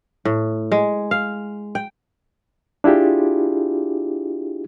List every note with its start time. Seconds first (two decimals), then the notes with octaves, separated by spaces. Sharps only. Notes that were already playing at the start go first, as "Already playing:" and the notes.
0.25 A2
0.72 G#3
1.11 F5
1.75 G5
2.84 D4 E4 F4 G4 G#4